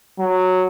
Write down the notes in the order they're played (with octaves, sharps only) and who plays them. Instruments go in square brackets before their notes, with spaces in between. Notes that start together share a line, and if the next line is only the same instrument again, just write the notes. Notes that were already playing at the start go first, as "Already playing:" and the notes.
[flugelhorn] F#3